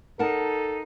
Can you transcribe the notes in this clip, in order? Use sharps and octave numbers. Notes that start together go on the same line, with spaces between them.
D#4 A4 A#4 F#5 A5